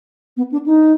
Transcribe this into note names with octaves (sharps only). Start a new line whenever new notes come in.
B3
D4
D#4